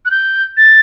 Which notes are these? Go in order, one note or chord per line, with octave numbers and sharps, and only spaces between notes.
F#6
G6
A6